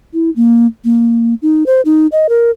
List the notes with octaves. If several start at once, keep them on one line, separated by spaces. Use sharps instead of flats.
E4
A#3
A#3
D#4
C5
D#4
D#5
A#4